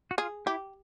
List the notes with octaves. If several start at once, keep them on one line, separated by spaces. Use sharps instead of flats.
F#4
F4 G#4
E4 G4